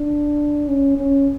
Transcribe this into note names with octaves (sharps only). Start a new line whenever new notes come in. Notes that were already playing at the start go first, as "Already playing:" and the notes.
Already playing: D4
C#4
C#4